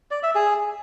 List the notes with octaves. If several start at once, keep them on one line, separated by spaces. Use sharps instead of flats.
D5
E5
G#4